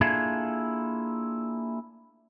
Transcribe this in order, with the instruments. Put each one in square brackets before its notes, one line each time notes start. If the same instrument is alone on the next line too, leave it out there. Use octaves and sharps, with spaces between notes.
[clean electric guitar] A#3 D4 E4 F4 G#4 A4